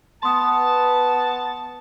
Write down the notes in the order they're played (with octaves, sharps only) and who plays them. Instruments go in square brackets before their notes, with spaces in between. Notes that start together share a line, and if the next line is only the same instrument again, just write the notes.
[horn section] B3 A5 [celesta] C6 D#6